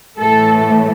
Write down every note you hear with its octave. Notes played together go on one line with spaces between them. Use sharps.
A2 E3 A3 A4